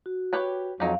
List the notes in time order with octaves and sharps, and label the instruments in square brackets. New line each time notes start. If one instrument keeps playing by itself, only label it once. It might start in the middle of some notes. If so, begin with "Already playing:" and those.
[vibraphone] F#4
[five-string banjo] G4 B4 C#5
[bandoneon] F2 F#3 [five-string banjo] D#4 G4 [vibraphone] F5